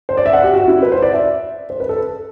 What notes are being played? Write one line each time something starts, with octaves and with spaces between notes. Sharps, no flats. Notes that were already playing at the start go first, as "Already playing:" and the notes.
C5
D5
E5
F#5
G4
F#4
E4
B4
C5
D5
E5
C5
B4
A4